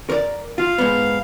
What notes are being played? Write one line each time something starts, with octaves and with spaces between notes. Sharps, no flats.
A#4 D5
F4 F5
G#2 B3